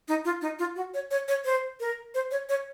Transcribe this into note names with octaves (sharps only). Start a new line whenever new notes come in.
D#4
F4
D#4
F4
F#4
C#5
C#5
C#5
C5
A#4
C5
C#5
C#5